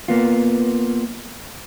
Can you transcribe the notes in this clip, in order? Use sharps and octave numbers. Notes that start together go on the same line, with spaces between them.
A#3 B3 F4